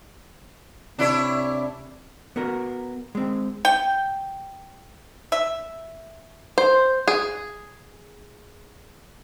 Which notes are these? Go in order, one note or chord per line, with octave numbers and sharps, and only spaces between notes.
C3 D4 E4 C#5
B3 F#4 A#4
G#3 C4
G5
E5
C5
G#4